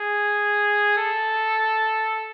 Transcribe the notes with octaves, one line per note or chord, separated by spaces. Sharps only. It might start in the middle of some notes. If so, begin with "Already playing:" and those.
Already playing: G#4
A4